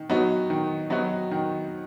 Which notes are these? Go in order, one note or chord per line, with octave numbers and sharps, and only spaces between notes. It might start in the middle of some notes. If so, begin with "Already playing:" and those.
Already playing: D#3
F#3 B3 D#4 F#4
D#3
F#3 B3 D#4 F#4
D#3